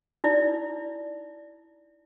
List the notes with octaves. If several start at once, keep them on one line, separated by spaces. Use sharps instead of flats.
D#4 E4 D5